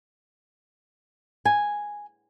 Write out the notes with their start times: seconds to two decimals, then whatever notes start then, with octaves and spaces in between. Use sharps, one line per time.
1.45 G#5